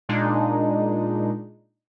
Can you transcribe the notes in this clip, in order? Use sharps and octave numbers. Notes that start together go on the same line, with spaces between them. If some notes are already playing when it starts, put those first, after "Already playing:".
A#2 G#3 D4 D#4